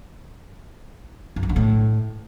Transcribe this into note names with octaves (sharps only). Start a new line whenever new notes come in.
F#2
E3
D3
A2